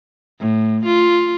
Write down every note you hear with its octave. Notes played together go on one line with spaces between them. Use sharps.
A2
F4